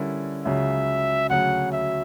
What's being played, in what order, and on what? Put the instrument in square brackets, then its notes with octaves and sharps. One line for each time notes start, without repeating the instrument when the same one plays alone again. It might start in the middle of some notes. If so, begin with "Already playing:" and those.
Already playing: [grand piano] D3 G3 C#4 E4 A#4
[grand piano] C#2 C#3 F#3 [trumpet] E5
[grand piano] D2 C#3 F#3 [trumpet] F#5
[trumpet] E5